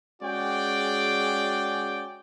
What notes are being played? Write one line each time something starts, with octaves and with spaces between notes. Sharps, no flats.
G#3 C#4 F#4 G#4 D5 G5